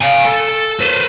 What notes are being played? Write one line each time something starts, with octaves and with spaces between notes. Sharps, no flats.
F5 G#5
A4
B4 C5